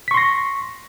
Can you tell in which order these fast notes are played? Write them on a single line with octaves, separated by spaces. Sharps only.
B6 C#6 C6 A#6